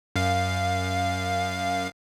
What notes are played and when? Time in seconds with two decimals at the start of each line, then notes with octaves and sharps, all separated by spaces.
0.16 F#2 F5